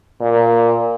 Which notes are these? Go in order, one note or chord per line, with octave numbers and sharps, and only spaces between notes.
A#2